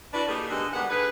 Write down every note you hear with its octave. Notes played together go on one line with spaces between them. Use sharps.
D4 E4 F#4 B4 D5
A3 A#3 D#4 G4 G#4 A#4
D3 G#3 B3 D#4 F#4 G4
G#2 D#3 G3 B3 F#5
D3 A3 G#4 B4